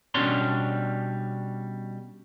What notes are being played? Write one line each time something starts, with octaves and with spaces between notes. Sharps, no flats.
B2 G3 C#4 D4 C#5 C6